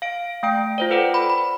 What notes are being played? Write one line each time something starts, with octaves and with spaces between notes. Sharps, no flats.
F5 D7
A3 F5 G5 D7
F4 C5 D5
A4 B4 C5 F#5 G5
B5
B5